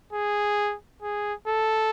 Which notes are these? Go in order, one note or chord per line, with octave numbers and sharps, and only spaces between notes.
G#4
G#4
A4